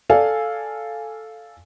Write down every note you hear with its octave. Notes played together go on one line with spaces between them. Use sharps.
A4 D5 F5 G#5